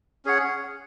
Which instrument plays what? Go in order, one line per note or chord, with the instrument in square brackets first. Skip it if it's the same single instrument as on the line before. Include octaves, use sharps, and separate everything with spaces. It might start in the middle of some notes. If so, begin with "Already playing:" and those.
[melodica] C#4 G#4 C#5 F#5